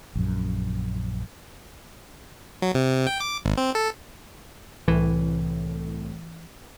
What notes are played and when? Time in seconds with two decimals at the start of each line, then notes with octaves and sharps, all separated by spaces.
0.15 A#1 F#2
2.62 F#3
2.75 C3
3.07 G5
3.20 D6
3.45 G#1
3.57 C4
3.75 A4
4.88 C2 A2 E3